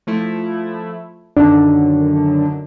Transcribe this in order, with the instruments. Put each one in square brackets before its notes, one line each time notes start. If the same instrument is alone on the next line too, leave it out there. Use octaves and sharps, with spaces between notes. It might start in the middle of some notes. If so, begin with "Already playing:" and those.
[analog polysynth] F3 A3 E4
[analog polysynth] F#2 D3 D#3 [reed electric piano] D4